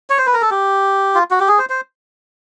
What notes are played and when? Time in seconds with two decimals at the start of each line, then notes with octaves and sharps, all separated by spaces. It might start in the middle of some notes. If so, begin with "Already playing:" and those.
0.10 C#5
0.18 C5
0.27 B4
0.34 A#4
0.42 A4
0.51 G4
1.15 F4
1.31 F#4
1.40 G4
1.48 G#4
1.58 C5
1.70 C5